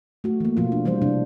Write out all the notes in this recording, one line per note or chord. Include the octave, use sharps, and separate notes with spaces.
A3 F#4
E3 A#3
B2 F3 F4
D4
E3 G3 F4 C5
C3 F3 D4